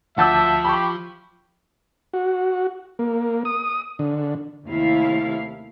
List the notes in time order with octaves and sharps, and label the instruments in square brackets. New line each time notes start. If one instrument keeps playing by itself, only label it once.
[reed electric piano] D2 A5 G6 [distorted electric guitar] F3 [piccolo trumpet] E5 [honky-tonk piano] F#5 D6 E6
[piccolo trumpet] G4 [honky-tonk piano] B5 C#6
[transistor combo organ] F#4
A#3
D#6
D3
[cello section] D#2 C3 A3 E4 F5